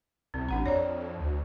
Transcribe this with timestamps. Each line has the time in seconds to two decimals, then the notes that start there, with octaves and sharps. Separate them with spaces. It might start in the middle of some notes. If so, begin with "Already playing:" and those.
0.34 C2 C4
0.49 A1 D4 F#5 A#5
0.66 F2 C#5 D5 A#5
1.19 D2